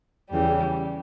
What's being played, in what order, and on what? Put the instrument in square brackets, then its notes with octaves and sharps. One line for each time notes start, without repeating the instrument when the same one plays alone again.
[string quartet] E2 C#3 E3 G3